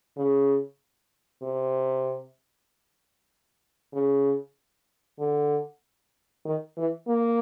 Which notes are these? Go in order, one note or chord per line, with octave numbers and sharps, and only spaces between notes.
C#3
C3
C#3
D3
D#3
E3
A#3